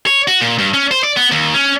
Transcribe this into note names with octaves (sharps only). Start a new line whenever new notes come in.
C#5
F#4
A#2
G2
C#4
C5
D5
B3
D#2
C#4